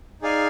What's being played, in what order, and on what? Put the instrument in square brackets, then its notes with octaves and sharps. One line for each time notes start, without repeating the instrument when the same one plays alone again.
[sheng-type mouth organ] D#4 G#4 D5 F5 G#5